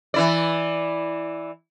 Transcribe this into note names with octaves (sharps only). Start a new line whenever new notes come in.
E3 E4 D5